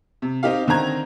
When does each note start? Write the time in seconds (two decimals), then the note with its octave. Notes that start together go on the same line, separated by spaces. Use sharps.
0.22 C3
0.43 C4 D#4 G4 F5
0.68 D3 D#3 C4 A#5 G#6